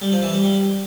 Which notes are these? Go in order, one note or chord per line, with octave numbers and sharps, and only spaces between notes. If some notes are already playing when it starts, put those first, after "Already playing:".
G3
F3
E3
G3
G3